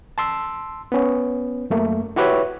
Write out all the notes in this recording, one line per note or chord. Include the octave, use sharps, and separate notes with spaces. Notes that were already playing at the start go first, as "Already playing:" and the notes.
A5 C6 E6
B3 C#4
F#2 A3 A#3
E4 F#4 G4 B4 C#5 E5